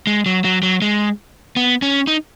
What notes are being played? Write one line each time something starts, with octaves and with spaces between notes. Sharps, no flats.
G#3
F#3
F#3
F#3
G#3
B3
C#4
D#4